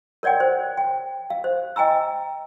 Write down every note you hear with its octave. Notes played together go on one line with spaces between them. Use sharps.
A#4 C#5 D5 F#5 G5
C5
G5
F5
C5
D#5 G5 G#5 A#5 E6